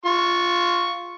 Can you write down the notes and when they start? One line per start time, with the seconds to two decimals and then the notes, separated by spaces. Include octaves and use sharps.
0.05 F4 C#6